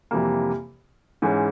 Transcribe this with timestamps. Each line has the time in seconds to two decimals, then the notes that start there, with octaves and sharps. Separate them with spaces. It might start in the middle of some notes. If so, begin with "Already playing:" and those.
0.11 F2 C3 E3 G3 A#3
1.22 G#2 E3 G#3 C#4